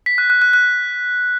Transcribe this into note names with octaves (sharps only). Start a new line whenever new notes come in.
B6
F#6
F#6
F#6
F#6